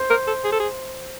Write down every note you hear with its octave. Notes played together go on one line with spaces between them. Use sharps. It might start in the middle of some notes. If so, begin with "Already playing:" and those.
Already playing: C5
A#4
A4
G#4
A4
G#4